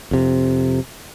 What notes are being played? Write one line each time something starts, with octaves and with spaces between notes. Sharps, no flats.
F2 C3